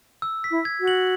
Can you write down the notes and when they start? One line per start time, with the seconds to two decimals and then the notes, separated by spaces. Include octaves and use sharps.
0.22 E6
0.44 B6
0.51 E4
0.65 G#6
0.80 F#4
0.88 F#7